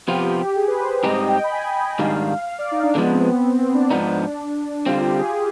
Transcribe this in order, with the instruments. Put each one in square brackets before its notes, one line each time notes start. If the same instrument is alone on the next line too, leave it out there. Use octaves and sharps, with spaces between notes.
[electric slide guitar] C3 F3 B3 F4 [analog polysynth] G4
[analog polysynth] G4
G4
G#4
B4
C5
[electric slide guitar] G#2 G3 C4 D#4 G4 [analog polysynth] D#5
[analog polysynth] G5
B5
G#5
[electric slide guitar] G#2 D#3 G3 D4 [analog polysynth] F5
[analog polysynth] F5
D5
D#4
D4
[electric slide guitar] D3 F3 G#3 [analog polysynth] B3
[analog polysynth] C4
B3
C4
C4
D4
[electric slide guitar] G#2 F3 B3 D#4
[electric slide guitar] D3 G3 C4 [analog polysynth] F4
[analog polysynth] G4
G#4